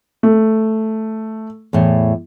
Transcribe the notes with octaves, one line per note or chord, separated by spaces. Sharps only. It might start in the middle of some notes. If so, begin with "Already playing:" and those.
A3
E2 A2